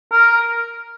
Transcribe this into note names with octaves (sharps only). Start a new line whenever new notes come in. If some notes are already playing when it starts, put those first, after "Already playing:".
A#4